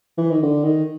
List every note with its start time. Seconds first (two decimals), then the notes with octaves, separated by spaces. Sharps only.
0.18 E3
0.31 D#3
0.43 D3
0.64 D#3